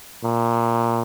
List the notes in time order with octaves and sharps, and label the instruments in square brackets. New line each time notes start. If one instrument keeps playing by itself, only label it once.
[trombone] A#2